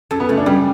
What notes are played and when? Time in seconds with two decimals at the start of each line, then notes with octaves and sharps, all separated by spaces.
0.11 F#2 A4
0.20 B3
0.29 C#3 A3
0.37 D4
0.46 F#2 G3